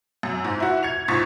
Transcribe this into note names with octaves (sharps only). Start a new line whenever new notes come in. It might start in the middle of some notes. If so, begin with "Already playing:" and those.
F#2
G#2
E4 F#4
G#6 C#7 F7
C#2 G#2 C#6 A6 B6